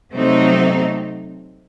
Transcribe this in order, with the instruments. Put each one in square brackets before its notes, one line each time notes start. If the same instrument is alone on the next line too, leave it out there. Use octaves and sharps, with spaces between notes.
[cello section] C3 F#3 A3 C4 D#4